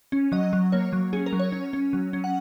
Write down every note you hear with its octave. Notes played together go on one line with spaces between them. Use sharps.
C#4
F#3 D#5
F#3
A#3 C#5
F#3
C#4 G#4
A#4
F#3
C#5
C#4
C#4
F#3
C#4
F#5